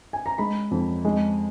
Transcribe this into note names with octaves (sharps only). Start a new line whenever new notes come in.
G#5
A#5
G#3 B5
F2
G#3